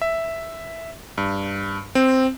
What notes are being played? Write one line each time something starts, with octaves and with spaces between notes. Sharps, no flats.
E5
G2
C4